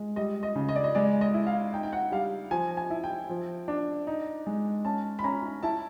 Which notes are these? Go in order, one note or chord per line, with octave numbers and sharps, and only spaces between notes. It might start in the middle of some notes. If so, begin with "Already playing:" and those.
Already playing: G#3
G3 D#5
D#5
C#3
D#5
D5
D#5
G#3 D5
D#5
E4
F5
D#4 G5
G5
F#5
G3 F5
F3 G#5
G#5
E4
G5
F3
D4
D#4
G#3
C#4 A5
B5
C#4 A#5
E4 A5